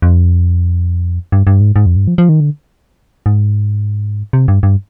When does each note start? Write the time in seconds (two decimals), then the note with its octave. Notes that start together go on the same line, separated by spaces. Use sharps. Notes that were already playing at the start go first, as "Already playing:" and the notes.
0.02 F2
1.32 G2
1.47 G2
1.61 G#2
1.76 G#2
1.86 F2
1.96 G2
2.08 F3
2.18 F3
2.29 D#3
2.40 D3
3.26 G#2
4.33 C3
4.48 G2
4.63 G2